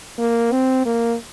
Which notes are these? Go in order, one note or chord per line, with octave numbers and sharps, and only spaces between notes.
A#3
C4
A#3